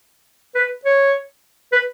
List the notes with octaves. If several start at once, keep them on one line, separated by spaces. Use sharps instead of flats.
B4
C#5
B4